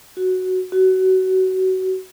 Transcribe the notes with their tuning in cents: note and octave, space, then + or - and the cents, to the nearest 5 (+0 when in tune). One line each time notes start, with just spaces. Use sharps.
F#4 +5
F#4 +25